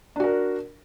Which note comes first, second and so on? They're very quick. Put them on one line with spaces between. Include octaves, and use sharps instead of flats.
D4 F#4 A#4